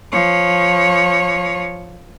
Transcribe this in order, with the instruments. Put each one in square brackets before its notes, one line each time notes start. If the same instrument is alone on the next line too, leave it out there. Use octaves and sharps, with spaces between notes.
[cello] F3 C#5